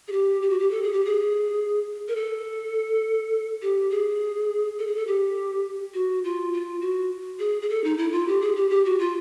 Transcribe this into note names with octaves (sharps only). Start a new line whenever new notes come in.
G#4
G4
G4
F#4
G4
A4
G#4
G4
G#4
A#4
A4
G4
G#4
A4
G#4
A4
G4
F#4
F4
F4
F#4
G#4
G#4
A4
D#4
E4
F4
G4
G#4
G4
G4
F#4
F4